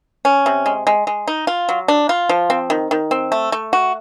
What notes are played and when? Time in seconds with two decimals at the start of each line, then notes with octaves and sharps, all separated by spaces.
0.25 C#4
0.46 C3
0.66 G#3
0.87 G#3
1.07 G#3
1.27 D#4
1.47 F4
1.69 F#3
1.88 D4
2.09 F4
2.29 F3
2.50 C4
2.70 D#3
2.91 D#3
3.11 C4
3.32 A3
3.52 A3
3.73 F#4